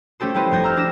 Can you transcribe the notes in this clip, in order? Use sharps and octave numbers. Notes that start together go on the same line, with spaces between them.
A3 C#4 G4 A4 C5
G3 E4 G4 B4 C5 D#5
F1 G3 A4 G6 G#6 A#6
A#5 E6 F6
D4 G4 A#6 E7